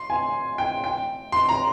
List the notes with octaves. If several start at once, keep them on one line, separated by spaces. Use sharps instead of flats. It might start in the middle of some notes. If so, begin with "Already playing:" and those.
Already playing: C6
G#5
G5
G5
C6
A#5